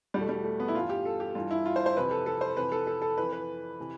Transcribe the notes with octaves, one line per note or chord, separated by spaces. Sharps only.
E2 B2 G3
A3
G3
A3
B3
E4
G2 E3 F4
G4
A4
G4
G2 E3 F4
E4
F4
C5
C5
F2 C3 E3 B4
A4
A4
C5
F2 C3 E3 B4
A4
A4
A4
F2 E3 B4
B4
C3 E3